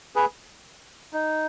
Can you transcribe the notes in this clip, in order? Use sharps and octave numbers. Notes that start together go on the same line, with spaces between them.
G#4 B4
D#4